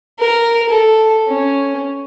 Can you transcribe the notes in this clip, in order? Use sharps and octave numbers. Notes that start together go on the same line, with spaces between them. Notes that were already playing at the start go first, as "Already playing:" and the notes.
A#4
A4
C#4